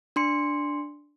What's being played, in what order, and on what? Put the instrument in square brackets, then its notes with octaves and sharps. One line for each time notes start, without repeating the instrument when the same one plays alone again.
[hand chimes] D4 C6 C#7